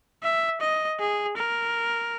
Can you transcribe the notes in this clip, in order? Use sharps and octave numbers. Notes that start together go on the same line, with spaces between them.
E5
D#5
G#4
A#4